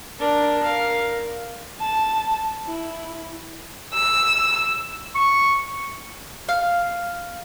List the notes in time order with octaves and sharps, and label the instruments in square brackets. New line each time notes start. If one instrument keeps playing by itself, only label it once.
[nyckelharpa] D4 A#4
A#4 F5
[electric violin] A5
E4
[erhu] E6
[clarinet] C#6
[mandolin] F5